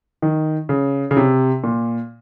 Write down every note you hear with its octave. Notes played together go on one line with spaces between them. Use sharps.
D#3
C#3
C#3
C3
A#2